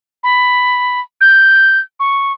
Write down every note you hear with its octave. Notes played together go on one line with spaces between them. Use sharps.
B5
G6
C#6